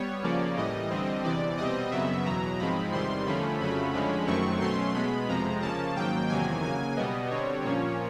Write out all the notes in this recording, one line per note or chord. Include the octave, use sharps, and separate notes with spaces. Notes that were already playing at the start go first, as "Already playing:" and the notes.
Already playing: G3 B3 C#5
C#3 F3 A#3 C#4 D5
A2 E3 G3 D#5
D3 G3 C4
E2 C3 E3 D5
B2 G3 C4 D#5
F#2 C#3 F#3 B3 E5
E2 B2 F#3 A#5
G#2 F3 G#3 C4 B5
E2 C3 D#3 G3 C6
D3 F3 A3 C#4 B5
F2 C#3 F#3 A3 C#4 B5
F2 D3 F3 G#3 C#4
F#2 D#3 F#3 A3 C4 C#6
B2 F#3 A3 C#4 C6
B2 G#3 B3 B5
F2 C3 F3 G#3 A#5
C#3 F3 A#3 C#4 A5
G#2 D#3 F#3 A#3 G5
E2 C3 D#3 F#3 A#3 G#5
C#3 F#3 A#3 G#5
B2 G3 B3 D#5
D3 G3 C4 C#5
A#2 F3 A#3 C#4 C#5